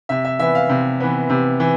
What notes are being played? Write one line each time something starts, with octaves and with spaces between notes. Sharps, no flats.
C3 E5
E5
E3 B3 E5
F5
C3
E3 B3
C3
E3